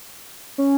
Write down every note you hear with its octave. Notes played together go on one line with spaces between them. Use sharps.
C#4